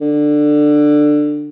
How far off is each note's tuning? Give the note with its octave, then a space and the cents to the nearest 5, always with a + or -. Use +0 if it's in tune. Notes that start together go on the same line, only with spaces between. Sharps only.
D3 +15